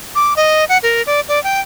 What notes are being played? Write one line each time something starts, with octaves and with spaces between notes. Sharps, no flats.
D6
D#5
F#5
A#4
D5
D5
G5